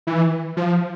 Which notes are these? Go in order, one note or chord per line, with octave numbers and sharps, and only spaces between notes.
E3
F3